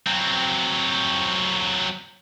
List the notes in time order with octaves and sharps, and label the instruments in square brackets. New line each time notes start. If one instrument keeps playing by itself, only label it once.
[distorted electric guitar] F#3 C4